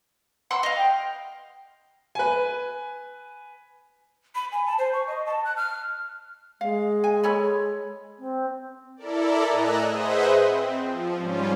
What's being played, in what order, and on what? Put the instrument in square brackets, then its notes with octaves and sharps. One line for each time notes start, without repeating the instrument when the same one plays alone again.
[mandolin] F#5 C6 E6
D#5 F5
[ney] G5
[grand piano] B4 G#5
[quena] B5
G#5
A5
C5
C#6
D#5
A5
F#6
F6
[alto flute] G#3 [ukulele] F5
[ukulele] G#5
A4 C#5 B5
[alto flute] C4
[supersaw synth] E4 A4 A#4 D5
A2 D#5 G#5 A#5 E6 F#6
G#4 B4 C5 D#5 E5 F#5
C4
F3
G#2 G3 C#4 F4